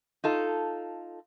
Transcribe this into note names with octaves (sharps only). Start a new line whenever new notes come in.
D#4 F4 A4